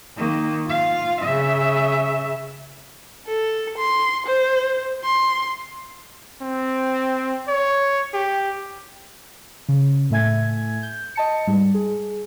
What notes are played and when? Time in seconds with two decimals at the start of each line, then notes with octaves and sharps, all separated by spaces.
0.17 D#3 A#3
0.67 F4 F5
1.22 C#3 E5
3.27 A4
3.78 C6
4.27 C5
5.04 C6
6.42 C4
7.48 C#5
8.14 G4
9.69 C#3
10.10 A2 A3 E5 G#5 G#6
10.83 G6
11.15 D#5 A5 C#7
11.47 G#2 G3
11.74 G#4